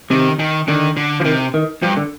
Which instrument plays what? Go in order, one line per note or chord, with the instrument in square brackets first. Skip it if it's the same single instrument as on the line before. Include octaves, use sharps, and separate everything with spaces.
[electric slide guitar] C3 [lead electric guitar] D#3
[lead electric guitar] D#3
[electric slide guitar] D3 [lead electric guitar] D#3
[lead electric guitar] D3
[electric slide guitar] F3
[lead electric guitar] C3 [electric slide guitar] D#3
[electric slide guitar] D#3
[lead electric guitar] G2 [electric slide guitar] F3
[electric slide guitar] D3